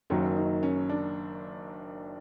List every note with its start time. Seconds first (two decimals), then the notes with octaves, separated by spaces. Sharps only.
0.10 F#1 F#2 D#3 F#3 A#3 C#4
0.37 D#4
0.63 C#4
0.89 D4